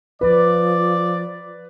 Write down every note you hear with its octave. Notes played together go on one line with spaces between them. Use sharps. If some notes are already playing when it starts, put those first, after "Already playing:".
F3 B4 D5